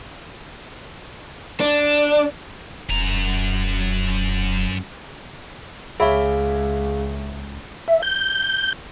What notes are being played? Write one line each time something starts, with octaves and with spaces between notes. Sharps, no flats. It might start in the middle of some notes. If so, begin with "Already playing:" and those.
D4
E1 F#2 A#5
C#2 G#4 C#5 E5 F5 B5
E5
G6